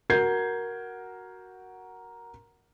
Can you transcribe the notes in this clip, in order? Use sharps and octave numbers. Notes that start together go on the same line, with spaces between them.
F#4 A#4 G6 G#6 C7